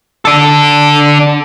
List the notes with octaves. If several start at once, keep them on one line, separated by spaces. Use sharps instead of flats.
D4 A4